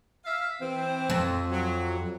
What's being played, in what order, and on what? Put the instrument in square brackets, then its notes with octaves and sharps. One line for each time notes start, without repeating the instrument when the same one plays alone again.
[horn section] E5 F5
E3 C4
[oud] F2
[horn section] F#3